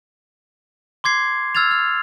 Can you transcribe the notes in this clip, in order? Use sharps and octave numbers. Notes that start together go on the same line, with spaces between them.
C6 D6 G#6 C7
E6 F6 G#6 A6 F7
F6